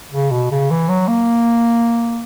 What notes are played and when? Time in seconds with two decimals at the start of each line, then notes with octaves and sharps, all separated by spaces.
0.13 C#3
0.31 B2
0.51 C#3
0.71 E3
0.89 F#3
1.08 A#3